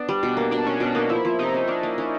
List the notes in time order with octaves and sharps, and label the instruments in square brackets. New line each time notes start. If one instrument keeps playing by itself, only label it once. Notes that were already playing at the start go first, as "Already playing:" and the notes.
Already playing: [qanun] B3 [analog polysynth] D4
[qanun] G3
B2
A#3
[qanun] B2 [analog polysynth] D4
[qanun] B2 [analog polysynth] C#4
[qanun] B2 [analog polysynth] D4
[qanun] A#3 [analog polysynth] D#4
[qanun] F3 [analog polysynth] E4
[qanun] F3
[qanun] C3 [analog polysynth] D#4
[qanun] C#4
[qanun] C#4 [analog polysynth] D4
[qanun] A#3
C#4